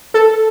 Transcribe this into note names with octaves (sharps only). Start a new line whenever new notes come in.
A4